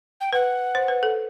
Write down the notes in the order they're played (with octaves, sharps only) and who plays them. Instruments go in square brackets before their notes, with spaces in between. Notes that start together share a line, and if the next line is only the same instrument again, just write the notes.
[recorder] G5
[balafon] B4 [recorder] F#5
[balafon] C5
B4
A4